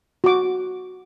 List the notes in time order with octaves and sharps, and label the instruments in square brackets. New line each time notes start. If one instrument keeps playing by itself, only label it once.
[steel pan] F#4 D6